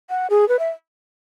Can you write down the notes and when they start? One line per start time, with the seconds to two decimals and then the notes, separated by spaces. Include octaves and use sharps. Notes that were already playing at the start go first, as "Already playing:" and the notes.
0.10 F#5
0.30 G#4
0.49 B4
0.59 E5